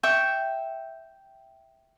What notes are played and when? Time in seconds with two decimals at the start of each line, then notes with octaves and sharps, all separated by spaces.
0.03 E5 G5 C#6